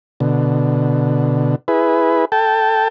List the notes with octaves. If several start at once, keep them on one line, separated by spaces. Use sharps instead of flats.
B2 D3
E4 G#4 B4
A4 G5 A5